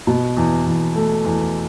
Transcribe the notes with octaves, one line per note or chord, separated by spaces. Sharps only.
B2
E2
E2
A3
E2